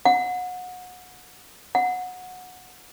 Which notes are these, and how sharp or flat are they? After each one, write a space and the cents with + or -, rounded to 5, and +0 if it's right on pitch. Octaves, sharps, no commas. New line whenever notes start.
F#5 -25
F#5 -15